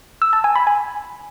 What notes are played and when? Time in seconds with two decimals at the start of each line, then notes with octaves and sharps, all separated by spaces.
0.22 E6
0.33 A5
0.44 G#5
0.55 B5
0.67 G#5